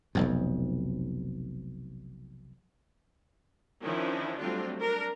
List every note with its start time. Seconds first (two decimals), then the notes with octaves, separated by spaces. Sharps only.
0.15 F1 B1 F2
3.84 D#3 F3 C#4 D4 E4
4.39 F#3 G3 A3 C4 D4 F4
4.81 D4 A#4